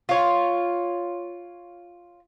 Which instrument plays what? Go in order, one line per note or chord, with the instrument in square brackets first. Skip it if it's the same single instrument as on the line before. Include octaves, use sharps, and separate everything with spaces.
[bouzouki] F4 C#5